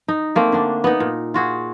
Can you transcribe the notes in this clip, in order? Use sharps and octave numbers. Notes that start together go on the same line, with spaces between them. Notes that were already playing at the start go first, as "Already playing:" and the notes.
D#4
A3 A#3 C4
D3 D4
B3 D#4
A#2
F4 F#4 G#4